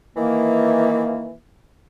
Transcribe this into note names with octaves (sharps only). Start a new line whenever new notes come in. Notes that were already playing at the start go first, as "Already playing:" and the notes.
D#3 E3 A#3